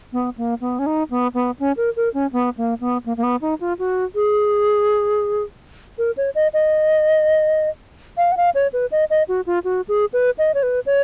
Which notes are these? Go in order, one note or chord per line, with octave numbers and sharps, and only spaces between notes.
B3
A#3
B3
C#4
D#4
B3
B3
C#4
A#4
A#4
C#4
B3
A#3
B3
A#3
A#3
B3
D#4
F4
F#4
G#4
A#4
C#5
D#5
D#5
F5
F#5
F5
C#5
B4
D#5
D#5
F#4
F4
F#4
G#4
B4
D#5
C#5
B4
C#5